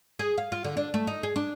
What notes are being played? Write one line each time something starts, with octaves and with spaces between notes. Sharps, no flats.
G#4
F5
F4
D3
D4
A3
D#4
G#4
D4